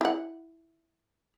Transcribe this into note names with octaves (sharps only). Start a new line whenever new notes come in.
E4 F#5